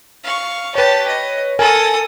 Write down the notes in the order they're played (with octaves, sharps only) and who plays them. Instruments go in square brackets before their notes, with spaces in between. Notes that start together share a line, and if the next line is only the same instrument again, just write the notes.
[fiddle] F5 C#6
[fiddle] G4 A5 [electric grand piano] B4 C#5
[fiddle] D#5
[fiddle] A4 D#6 [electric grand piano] A#4 G#5